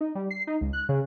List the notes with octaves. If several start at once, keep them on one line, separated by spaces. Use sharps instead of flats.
D#4
G3
C7
D#4
C#2
F#6
C#3